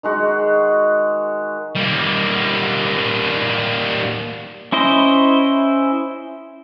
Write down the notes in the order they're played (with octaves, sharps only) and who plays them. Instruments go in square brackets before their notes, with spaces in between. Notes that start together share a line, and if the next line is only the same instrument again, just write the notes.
[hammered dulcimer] D#3 G#3 F#4
[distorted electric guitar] G3 A#3
[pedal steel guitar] C#4 E4 C5 D#5